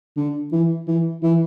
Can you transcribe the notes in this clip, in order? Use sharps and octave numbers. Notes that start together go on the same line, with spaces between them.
D3
E3
E3
E3